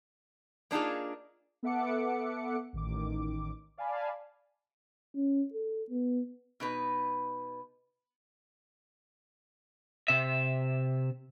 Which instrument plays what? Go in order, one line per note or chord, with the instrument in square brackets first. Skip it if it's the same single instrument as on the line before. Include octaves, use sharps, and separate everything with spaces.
[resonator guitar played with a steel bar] A#3 D4 D#4 F4 G#4
[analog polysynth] B3 A4 E5 F#5 D6 C#7
A1 D#3 D6
D5 F5 G#5 A5 B5
[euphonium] C#4
A4
B3
[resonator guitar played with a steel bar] B2 D#4 B4
[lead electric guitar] C3 E5